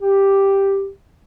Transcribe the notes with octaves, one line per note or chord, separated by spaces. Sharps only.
G4